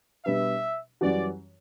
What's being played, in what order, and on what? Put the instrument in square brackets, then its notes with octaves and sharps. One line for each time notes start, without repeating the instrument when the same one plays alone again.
[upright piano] B2 G3 B3 D4 [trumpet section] E5
[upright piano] F#2 E3 G3 C#4 F#4 [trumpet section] D5